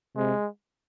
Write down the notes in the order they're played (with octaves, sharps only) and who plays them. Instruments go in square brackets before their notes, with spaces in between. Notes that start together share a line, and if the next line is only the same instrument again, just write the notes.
[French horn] C3 [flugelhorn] G#3